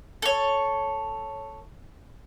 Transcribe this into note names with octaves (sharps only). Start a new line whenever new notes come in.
A4 C#5